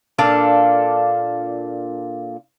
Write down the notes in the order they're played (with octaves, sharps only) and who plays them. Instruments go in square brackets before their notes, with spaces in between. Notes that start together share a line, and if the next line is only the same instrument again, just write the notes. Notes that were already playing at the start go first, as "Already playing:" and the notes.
[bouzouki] A#2 D4 A4 F5